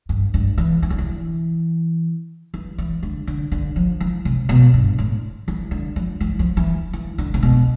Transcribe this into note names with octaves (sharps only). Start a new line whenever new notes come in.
G2
G2
E3
E3
D3
E3
E3
E3
D3
D3
D3
F3
E3
C3
B2
G2
A2
E3
D3
F3
E3
F3
E3
E3
D3
C3
B2